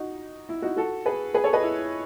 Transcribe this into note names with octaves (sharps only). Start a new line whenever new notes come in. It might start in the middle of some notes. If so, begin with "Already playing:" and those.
Already playing: D#4 F#4
E4
D#4 F#4
F#4 A4
G#4 B4
G#4 B4
A4 C#5
B4 D#5
E4